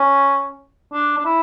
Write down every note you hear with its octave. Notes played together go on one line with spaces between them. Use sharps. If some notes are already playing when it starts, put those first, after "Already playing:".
Already playing: C#4
D4
D4
E4